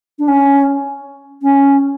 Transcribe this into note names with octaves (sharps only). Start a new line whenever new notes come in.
D4
C#4
C#4